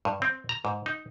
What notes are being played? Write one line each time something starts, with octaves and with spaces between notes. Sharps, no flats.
G2
C4
A#5
G#2
D#4